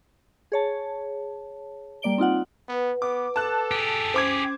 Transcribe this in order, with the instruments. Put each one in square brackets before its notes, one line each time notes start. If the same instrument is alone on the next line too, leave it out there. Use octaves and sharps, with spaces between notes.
[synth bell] G#4 C#5 A5
G3 A#3 D5 D7 G7
C4 D#4 F4 F#5
[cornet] B3 [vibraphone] B4 F#5
[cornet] B3 [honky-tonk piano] D6
[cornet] A4 [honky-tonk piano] A5 F#6
[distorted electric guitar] G4 G#4
[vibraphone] C#4 [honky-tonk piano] C5 D6 G#6